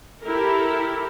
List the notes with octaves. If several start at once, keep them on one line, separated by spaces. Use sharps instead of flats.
E4 G4 A4 A#4